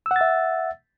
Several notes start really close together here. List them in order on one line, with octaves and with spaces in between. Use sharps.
E6 F#5 A6 E5